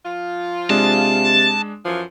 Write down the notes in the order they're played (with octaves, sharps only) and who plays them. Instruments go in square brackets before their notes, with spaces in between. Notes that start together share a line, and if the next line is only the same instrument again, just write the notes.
[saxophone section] F3 F4
[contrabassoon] C3 [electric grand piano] G#3 D4 [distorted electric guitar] A5
[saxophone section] F#2 E3 F3